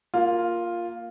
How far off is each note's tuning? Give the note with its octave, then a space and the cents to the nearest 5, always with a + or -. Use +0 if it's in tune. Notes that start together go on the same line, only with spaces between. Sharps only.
A#3 +0 F4 +0